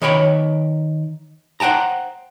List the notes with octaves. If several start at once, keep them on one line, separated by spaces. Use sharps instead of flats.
D#3 B4 C#5 G5 B5
C5 F#5 G5 A5 A#5